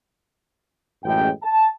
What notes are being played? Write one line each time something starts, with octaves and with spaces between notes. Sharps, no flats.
A1 F#2 G#3 G5
A5